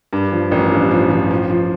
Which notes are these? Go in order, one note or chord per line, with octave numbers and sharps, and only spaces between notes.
G2
F3
A1
G2
F3
F3
F3
F3